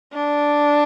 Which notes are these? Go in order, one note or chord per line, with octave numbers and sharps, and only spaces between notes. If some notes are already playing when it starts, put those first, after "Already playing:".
D4